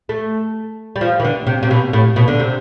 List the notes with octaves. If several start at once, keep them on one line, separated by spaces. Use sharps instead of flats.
A3
G3
F3
E3
D3
C3
C3
B2
A2
B2
D3
C3